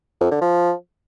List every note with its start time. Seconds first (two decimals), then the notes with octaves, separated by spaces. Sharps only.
0.21 F2
0.31 D3
0.41 F3